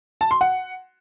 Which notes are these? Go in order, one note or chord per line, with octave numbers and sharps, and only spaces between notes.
A5
C6
F#5